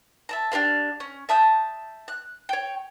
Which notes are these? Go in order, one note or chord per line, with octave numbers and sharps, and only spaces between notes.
E5 A5 A#5
D4 G4 B4 F5
C#4
E5 A5 D#6 G6
F#6
C#5 G5